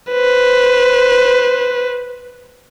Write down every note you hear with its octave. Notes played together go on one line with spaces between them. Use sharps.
B4 C5